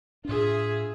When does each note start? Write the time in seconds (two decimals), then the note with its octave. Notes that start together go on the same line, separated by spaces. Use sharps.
0.25 A2 D4 F4 G#4 E5